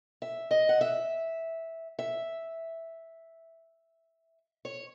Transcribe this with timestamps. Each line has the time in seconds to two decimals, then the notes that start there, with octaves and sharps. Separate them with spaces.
0.22 E5
0.51 D#5
0.69 F#5
0.81 E5
1.99 E5
4.65 C#5